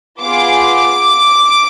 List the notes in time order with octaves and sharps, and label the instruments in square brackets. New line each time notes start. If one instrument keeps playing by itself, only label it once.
[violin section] B3 F4 G#4 D6